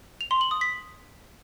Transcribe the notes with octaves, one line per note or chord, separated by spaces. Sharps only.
F7
C6
F#7
D#6
B6